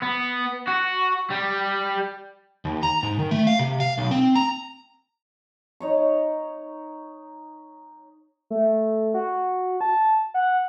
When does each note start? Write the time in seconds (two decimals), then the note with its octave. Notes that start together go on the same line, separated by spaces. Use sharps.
0.03 B3
0.67 F#4
1.30 G3
2.65 D#2
2.83 A#5
3.03 G#2
3.19 D#3
3.31 A3
3.47 F5
3.59 C3
3.80 F5
3.98 B1
4.11 C4
4.36 A#5
5.80 D#4 C#5 C#6
8.50 A3
9.14 F#4
9.81 A5
10.34 F#5